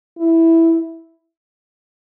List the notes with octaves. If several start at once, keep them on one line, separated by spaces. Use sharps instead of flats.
E4